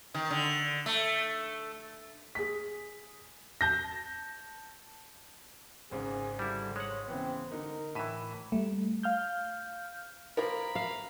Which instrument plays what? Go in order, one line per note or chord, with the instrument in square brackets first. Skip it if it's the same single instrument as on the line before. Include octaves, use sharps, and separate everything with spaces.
[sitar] D#3
D3
A3
[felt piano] G#4 B6
[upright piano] A5 G6 A#6
[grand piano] G#1 G#2 C#3 [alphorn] G#4
[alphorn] D3 [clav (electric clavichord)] G3 E4
[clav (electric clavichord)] G#3 F#5 [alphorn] C#5
[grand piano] C#3 E3 B3 [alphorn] C4
[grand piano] D3 D#4 [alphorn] A#4
[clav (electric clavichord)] A2 E3 [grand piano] B6 D#7 E7
[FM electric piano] G3 A3
F5 F6 G6
[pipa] F3 A#3 [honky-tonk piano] A#4 [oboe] B5
[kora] F5